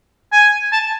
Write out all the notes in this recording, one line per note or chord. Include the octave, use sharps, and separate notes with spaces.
G#5
A5